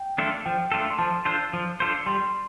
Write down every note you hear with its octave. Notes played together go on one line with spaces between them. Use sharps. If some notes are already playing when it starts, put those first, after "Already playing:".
Already playing: G5
A3 D4 F4 A4
F3 G5
A3 D4 F4 A4
C6
F3 A5
D4 F4 A4 C5
F3
D4 F4 A4 C5
G3 C6